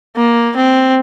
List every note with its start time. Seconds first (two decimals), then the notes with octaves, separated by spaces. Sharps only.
0.17 A#3
0.56 C4